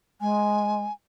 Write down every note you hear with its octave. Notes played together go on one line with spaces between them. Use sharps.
G#3 G#5